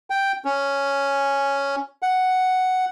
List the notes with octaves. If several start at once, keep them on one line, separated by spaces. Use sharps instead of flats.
G5
C#4
F#5